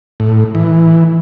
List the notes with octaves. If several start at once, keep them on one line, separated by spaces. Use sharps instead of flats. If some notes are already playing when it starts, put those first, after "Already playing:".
A2
E3